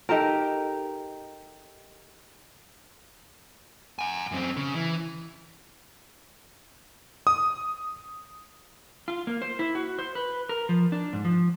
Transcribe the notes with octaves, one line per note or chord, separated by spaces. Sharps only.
D#4 G4 A4 A#4
F#5 G#5
F#2 C4
C#3
E3
D#6
F4
A#3
C5
E4
F#4
C5
B4
A#4
F3
D4
G#2
F3